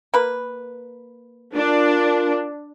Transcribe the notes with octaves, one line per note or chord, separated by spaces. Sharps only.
A#3 B4
D4 F4 A#4